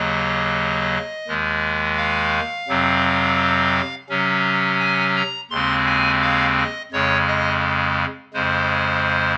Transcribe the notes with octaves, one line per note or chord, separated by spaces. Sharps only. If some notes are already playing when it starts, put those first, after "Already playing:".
Already playing: D#2 C#3 F#3 A#3 D#5
D#2 D#3 G#3
F5
F2 C3 F#3 C4
C3 F#3 C#4
G#5
A#5
D#2 C#3 G#3 C4 C6
G#5
F5
D#5
F2 C#3 G#3 C#5
D#5
F2 C#3 G#3 C5